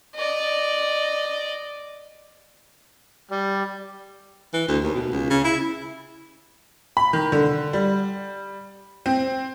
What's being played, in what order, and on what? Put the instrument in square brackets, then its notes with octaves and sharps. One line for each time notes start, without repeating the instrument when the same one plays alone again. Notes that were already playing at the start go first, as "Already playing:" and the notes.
[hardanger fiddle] D5 D#5
[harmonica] G3
[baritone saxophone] E3
D2
D#2
B2
C#2
C#3
E4
[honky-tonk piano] B5
D#3
D3
G3
C4